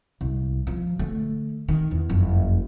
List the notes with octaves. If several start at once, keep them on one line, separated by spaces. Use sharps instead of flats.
C2
F3
D3 A3
D#3
E2
F#1 F2